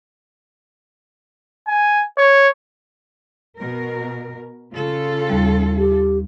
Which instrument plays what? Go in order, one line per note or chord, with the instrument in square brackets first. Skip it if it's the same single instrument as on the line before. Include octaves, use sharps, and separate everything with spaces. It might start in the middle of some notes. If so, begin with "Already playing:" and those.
[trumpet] G#5
C#5
[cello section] B2 A#4
C#3 F4 A4
[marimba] D#2 G3
[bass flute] G4